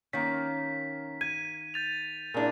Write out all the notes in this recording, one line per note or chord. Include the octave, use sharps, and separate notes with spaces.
D#3 A#3 C#4 A#5 B6
G#6 D#7
G6 A6 F7
A#2 D4 E4 G#4 A#4